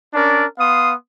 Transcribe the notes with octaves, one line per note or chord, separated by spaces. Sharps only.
C#4 D4 A#4 D5
B3 F5 C6 D#6